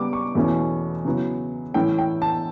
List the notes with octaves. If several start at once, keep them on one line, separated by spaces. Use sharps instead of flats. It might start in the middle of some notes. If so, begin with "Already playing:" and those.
Already playing: C#3 G3 B3 D6
C#6
E2 B2 A3 C#4 E4
C#3 F#3 B3 E4
A2 E3 A3 C#4 E4 G5
G5
A5